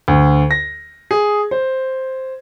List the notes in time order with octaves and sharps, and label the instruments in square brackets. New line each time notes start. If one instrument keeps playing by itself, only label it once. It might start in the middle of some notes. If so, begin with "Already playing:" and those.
[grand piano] D2
A#6
G#4
C5